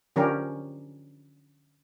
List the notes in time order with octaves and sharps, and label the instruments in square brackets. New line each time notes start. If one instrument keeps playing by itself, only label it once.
[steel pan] D3 F3 C#4 D4 G4 A#4